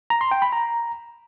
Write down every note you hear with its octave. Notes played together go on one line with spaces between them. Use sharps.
A#5
C6
G5
B5
A#5